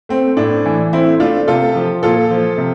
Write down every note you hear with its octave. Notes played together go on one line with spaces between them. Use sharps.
A3 C4
A2 D4
E3
A3 C4 E4
A3 D4 F4
C3 F4 A4
F3
A#2 F4 A4
F3
C3